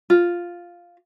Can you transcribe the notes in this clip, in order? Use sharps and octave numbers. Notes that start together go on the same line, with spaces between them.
F4